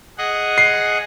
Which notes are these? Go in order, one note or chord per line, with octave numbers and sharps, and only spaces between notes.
G#4 D#5 F#5
C7